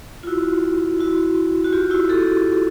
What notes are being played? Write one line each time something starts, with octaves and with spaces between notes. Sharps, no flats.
F4
E4 F#4
E4 F#4
F#4
F4 G4
E4 F#4
G4 A4